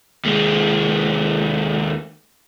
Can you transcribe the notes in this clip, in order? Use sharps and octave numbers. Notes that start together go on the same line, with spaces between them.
D#2 G#3